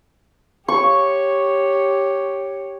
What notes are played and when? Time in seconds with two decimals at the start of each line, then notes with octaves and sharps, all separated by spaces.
0.68 G4 C#5 C#6